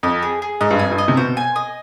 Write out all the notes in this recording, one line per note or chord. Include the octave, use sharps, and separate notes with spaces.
F2 D#5
G#4
G#4
G#2 D#5
G2
F2 G#5
G2
D#5
C3
B2 C5
G#5
D#5